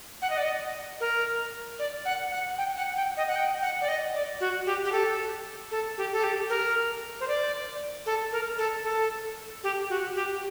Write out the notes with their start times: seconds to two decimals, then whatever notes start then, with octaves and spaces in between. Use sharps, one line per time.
0.22 F#5
0.30 D#5
0.37 D5
0.44 D#5
1.00 A#4
1.79 D5
2.05 F#5
2.31 F#5
2.58 G5
2.77 F#5
2.96 G5
3.17 D#5
3.28 F#5
3.36 G5
3.62 F#5
3.82 D5
3.88 D#5
4.14 D5
4.40 F#4
4.66 G4
4.85 G4
4.92 A4
5.71 A4
5.98 G4
6.12 A4
6.24 G4
6.50 A#4
7.20 C5
7.28 D5
8.06 A4
8.32 A#4
8.58 A4
8.84 A4
9.64 G4
9.90 F#4
10.15 G4